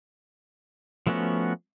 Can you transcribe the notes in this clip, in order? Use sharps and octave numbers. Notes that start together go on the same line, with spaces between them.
F3 A3 B3 C#4 F#4